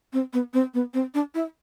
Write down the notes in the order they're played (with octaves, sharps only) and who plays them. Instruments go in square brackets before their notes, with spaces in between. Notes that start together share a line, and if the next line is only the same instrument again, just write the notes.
[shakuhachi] C4
B3
C4
B3
C4
D4
E4